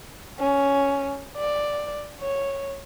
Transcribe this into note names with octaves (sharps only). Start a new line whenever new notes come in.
C#4
D5
C#5